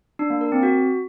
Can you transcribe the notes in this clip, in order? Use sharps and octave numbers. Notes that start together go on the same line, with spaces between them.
D4
A#3
A#4
C4
F#4